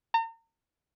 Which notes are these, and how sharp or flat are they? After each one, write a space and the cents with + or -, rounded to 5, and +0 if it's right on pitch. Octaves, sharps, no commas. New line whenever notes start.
A#5 -40